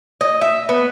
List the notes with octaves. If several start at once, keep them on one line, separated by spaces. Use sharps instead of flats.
D#5
E5
B3